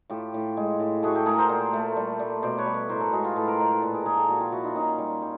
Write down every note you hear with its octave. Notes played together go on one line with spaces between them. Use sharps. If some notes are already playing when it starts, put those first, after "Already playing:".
A2 F4 G4
A2
G#3
A2
A3 F#4 G#4
G4 A4
A3 G#4 A#4
A#4 C5
A#2
A3
G3
G3
B2 C5 D5
B4 C#5
G3
B4 C#5
A2 A#4 C5
A4 B4
G#3 F#4 G#4
F4 G4
A2 A4 B4
A#4 C5
G#3 A#4 C5
A4 B4
A#2 A4 B4
G#4 A#4
F3 G#4 A#4
G4 A4
A#2 F#4 G#4
F4 G4
F3 E4 F#4
D#4 F4
A#2 C#4 D#4
G3
G3